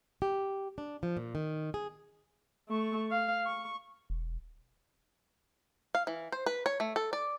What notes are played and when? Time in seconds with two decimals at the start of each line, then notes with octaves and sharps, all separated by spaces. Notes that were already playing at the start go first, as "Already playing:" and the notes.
0.22 G4
0.78 D4
1.03 F3
1.17 A#2
1.35 D#3
1.74 G#4
2.69 A3 C#6
3.11 F5
3.46 C#6
4.10 E1
5.95 F5
6.07 E3
6.32 C5
6.46 B4
6.66 C#5
6.80 A3
6.96 A4
7.13 D5